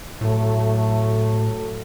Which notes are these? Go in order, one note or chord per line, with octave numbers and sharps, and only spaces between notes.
A2 F#3 A3